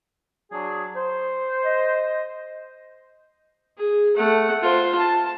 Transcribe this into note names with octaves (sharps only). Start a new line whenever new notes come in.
F#3 D4 G#4
C5
D#5
G#4
A3 F#5
F4 C5
A5